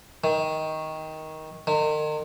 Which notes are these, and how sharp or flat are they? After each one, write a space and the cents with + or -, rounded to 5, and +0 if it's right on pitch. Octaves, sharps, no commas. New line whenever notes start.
D#3 +15
D#3 -35